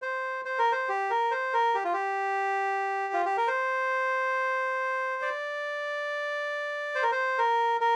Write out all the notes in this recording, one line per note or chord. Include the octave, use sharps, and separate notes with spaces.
C5
C5
A#4
C5
G4
A#4
C5
A#4
G4
F4
G4
F4
G4
A#4
C5
D5
C5
A#4
C5
A#4
A#4